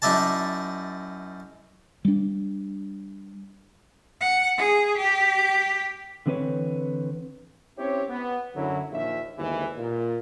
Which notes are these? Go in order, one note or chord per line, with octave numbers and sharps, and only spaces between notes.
F#2 D#4 E4 D5 A5
G3 D4
F#5
G#4
G4
D3 E3 C4 G#4 B4 C#5
C4 C#4 E4 G4 C#5
B3
F#2 D3 F#3 E4
A#1 D#2 E5
G1 D#2 G#2 E3
A#2